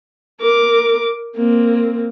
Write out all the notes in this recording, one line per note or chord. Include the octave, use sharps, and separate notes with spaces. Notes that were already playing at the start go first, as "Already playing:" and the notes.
A#4 D6
A#3 C4